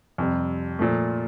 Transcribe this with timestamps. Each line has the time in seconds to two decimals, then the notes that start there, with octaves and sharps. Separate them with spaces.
0.18 F2 C3 G3
0.79 A#2 F3 A3